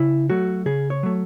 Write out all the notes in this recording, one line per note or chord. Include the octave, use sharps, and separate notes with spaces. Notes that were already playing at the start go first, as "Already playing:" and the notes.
Already playing: C#3 E4
F#3 A3 F#4
C#3 G#4
C#5
F#3 A3